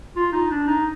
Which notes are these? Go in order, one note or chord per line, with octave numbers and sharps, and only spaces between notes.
F4
D#4
D4
D#4